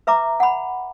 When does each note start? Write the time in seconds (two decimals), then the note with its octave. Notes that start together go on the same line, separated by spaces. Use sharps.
0.07 B4 E5 A#5 D6
0.40 F#5 B5